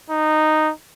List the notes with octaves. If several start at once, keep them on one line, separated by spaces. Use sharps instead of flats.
D#4